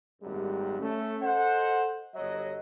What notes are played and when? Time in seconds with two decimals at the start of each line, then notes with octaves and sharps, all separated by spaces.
0.22 G#1 F#2 A#2 G3
0.79 A3 C#4
1.22 A4 C5 D#5 F#5
2.15 G1 F#3 C#5 D#5